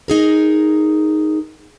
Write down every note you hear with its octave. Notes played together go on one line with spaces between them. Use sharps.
D#4 G#4 A#4